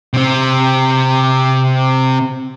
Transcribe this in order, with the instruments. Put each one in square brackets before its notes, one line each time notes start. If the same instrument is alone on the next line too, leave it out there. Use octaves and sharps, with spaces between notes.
[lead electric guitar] C3 C4